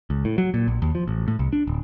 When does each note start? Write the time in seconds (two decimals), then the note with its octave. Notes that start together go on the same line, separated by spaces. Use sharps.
0.10 C#2
0.25 A2
0.38 F#3
0.54 A#2
0.68 A#1
0.82 D#2
0.95 F3
1.08 A1
1.28 A2
1.39 C2
1.53 D4
1.67 D1